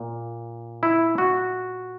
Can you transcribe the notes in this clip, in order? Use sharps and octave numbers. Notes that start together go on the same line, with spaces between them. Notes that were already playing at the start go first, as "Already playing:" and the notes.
Already playing: A#2
E4
F#4